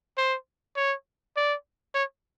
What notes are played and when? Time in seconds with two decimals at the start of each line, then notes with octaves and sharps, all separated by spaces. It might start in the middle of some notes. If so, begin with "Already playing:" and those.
0.17 C5
0.76 C#5
1.37 D5
1.95 C#5